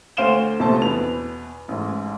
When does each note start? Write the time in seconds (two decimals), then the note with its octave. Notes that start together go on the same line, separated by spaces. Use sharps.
0.17 D2 C5 F5 D7 E7 G7
0.60 A#1 C3 A3 C5 A5
0.82 E2 B2 B4 F7
1.68 A1 G#2